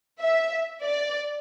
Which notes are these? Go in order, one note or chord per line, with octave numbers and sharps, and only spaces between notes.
E5
D5